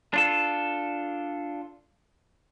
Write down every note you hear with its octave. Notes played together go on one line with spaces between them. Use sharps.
D4 F4 A4